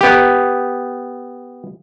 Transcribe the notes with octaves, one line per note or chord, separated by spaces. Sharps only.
B3 G4